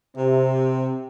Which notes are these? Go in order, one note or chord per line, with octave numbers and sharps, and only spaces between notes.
C3